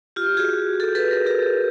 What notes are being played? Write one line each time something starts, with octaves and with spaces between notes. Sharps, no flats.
F4 G4
F#4 G#4
G4 A4
A4 B4
G#4 A#4
G4 A4